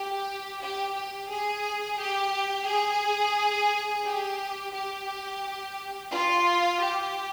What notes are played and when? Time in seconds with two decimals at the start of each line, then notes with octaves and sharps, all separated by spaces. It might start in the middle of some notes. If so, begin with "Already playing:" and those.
Already playing: G4
0.62 G4
0.96 G4
1.30 G#4
1.99 G4
2.67 G#4
4.05 G4
4.73 G4
6.12 F4
6.81 G4